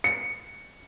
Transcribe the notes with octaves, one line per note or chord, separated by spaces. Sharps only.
C#7